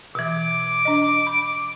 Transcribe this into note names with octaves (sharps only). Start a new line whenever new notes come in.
B2 E3 D6
D4 D#5
B5